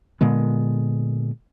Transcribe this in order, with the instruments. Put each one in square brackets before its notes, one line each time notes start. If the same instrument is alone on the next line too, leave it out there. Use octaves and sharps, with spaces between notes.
[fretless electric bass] A#2 D3 G#3 B3